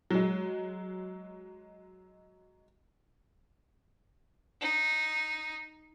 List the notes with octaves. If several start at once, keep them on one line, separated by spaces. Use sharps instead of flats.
F#3 G#3
D#4